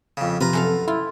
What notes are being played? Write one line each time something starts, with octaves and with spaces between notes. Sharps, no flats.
F2 C#3
C3 F3 F4 B4 A#5
F#2 A4 F5
E4 F4